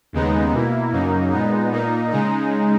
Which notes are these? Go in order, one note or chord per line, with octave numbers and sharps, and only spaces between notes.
D#2 C#3 G#3 B3 D#4
B2 A#3 E4
F#2 C#3 F#3 A#3 D#4
A#2 G#3 B3 D#4
A#2 A#3 D#4
C#3 G#3 D#4